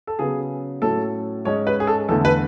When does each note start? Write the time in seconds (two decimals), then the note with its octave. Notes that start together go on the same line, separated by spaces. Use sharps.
0.07 A4
0.19 C#3 F#3 B3 G#4
0.82 A2 F#3 C#4 A4
1.45 G#2 G#3 C#4 C#5
1.67 B4
1.80 G#4
1.87 A4
2.09 E2 D3 A3 A4
2.25 B4